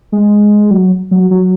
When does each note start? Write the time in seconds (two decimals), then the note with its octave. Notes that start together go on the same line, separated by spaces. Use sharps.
0.12 G#3
0.71 F#3
1.11 F#3
1.31 F#3